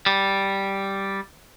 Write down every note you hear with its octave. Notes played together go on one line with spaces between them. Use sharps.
G3